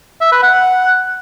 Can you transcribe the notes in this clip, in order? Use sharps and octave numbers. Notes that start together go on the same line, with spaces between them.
E5
B4
F#5